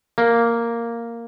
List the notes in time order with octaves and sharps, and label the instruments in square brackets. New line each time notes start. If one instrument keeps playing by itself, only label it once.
[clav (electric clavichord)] A#3